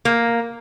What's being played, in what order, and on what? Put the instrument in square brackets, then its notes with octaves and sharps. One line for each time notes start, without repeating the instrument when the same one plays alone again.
[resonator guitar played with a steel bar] A#3